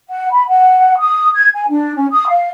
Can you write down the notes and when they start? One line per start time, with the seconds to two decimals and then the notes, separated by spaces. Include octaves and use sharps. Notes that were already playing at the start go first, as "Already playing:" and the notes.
0.08 F#5
0.31 B5
0.47 F#5
0.99 D#6
1.34 G#6
1.54 G#5
1.69 D4
1.95 C#4
2.11 D#6
2.28 F5